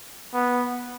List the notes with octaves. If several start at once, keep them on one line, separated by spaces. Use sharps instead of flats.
B3